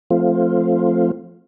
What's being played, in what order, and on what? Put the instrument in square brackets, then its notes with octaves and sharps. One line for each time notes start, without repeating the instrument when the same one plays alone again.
[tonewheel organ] F3 A3 C4 F4